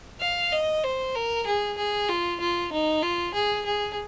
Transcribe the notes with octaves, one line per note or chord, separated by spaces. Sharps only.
F5
D#5
C5
A#4
G#4
G#4
F4
F4
D#4
F4
G#4
G#4